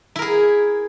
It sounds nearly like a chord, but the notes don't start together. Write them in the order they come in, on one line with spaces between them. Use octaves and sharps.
E4 A#4 G#4